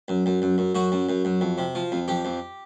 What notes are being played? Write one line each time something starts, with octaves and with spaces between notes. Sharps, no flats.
F#2
F#2
F#2
F#2
F#2 F#4
F#2
F#2
F#2
F2
C3
F3
F2
F2 G4
F2